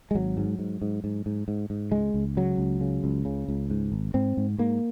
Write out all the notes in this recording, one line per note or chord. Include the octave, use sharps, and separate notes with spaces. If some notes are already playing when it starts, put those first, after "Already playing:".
G#3
G#1 F#3
G#2
G#2
G#2
G#2
G#2
G#2
G#2
C#2 G#3
C#2
C#3 F#3
C#2
C#3
C#2
C#3
C#2
G#2
G#1
G#2 C4
G#2
G#2 A#3